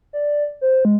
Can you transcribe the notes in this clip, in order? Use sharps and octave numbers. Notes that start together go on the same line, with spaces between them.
D5
C5
G#3